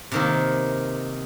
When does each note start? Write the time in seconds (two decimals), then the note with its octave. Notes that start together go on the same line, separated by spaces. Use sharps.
0.12 C3 D#3 A#3